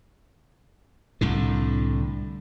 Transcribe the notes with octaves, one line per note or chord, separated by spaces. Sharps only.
C2 A2 D3